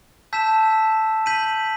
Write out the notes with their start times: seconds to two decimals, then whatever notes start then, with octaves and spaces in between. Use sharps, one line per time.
0.33 A5 E6 G6 B6 E7
1.26 G6 B6 D#7 F#7